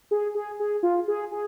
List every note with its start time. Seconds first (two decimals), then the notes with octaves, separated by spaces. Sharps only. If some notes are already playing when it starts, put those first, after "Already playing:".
0.11 G#4
0.35 G#4
0.60 G#4
0.83 F4
1.08 G#4
1.32 G#4